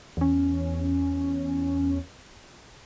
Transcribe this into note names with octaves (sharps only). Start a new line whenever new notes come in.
E2 C#4